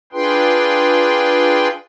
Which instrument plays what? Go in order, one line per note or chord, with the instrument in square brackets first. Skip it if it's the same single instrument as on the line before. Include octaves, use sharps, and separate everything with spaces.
[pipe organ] D4 F4 G#4 B4 G5 C6